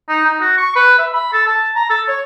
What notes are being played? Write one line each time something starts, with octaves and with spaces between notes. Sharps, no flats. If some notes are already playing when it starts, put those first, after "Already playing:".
D#4
D#4
F#4
C#6
B4
E5
B5
A4
A5
A#5
A4
C#5